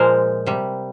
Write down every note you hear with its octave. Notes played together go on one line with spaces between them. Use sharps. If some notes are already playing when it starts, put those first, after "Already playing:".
Already playing: A#2 F3 G#3 A#4 C5
C3 G3